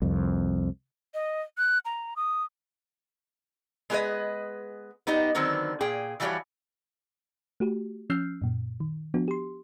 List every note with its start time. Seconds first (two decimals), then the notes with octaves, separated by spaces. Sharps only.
0.02 C2 F2
1.14 D#5
1.58 F#6
1.85 A#5
2.16 D#6
3.90 G#3 B3 G#4 A#4 B4 D#5
5.07 B3 D#4 G4 D#5
5.35 D3 D#3 F#3 B3 C4
5.81 A#2 G#4 G5
6.20 E3 F3 G3 F#4 G4 C#5
7.60 A3 F#4 G4
8.10 F3 C#4 E6 F6 G6 C7
8.42 F#2 A#2
8.80 D#3
9.14 F3 B3 D4 F#4
9.28 G4 C6